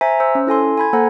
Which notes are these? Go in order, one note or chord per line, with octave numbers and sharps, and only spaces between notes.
C5 E5 G#5 A#5 B6
C5 E6
C#4
E4 A4 G#5 C6
G#5 B5 G#6
A#3 A4 C5 F#5 A#5